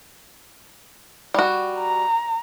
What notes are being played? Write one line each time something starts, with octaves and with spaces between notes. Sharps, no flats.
G3 F#4
A#5